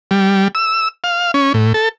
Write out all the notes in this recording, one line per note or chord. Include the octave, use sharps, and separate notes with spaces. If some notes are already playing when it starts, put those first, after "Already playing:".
G3
E6
F5
C#4
A2
A4